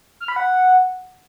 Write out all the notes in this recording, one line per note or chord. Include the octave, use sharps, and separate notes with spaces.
F6
B5
F#5